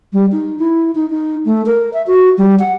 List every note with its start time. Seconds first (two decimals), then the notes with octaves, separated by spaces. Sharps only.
0.13 G3
0.32 D#4
0.59 E4
0.95 D#4
1.10 D#4
1.45 A3
1.66 A#4
1.93 E5
2.07 F#4
2.38 G3
2.59 F#5